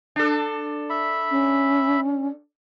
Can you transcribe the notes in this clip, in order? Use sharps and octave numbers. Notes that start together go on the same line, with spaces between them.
D4 A4
E5 B5
C#4